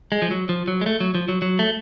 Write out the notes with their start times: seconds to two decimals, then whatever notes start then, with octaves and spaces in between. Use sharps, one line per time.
0.12 G#3
0.22 F3
0.31 F#3
0.49 F3
0.68 F#3
0.81 G#3
0.86 A3
1.00 F#3
1.15 F3
1.29 F#3
1.42 F#3
1.59 A3